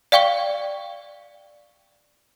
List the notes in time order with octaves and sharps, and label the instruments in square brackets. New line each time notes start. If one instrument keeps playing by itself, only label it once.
[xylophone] D5 F5 G5 C#6 G7